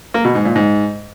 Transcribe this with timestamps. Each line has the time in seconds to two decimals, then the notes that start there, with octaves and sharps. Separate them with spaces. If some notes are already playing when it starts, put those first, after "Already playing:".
0.14 A#3
0.25 B2
0.35 G#2
0.45 A#2
0.55 G#2